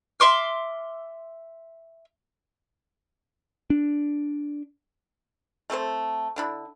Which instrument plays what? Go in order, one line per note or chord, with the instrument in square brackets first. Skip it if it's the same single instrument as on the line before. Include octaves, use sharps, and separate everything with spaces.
[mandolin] E5 C6 D6 F6
[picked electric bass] D4
[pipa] A3 C4 A4 C5
D3 D4 E4